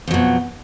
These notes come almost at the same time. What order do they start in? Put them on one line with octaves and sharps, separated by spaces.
F2 F#3 B2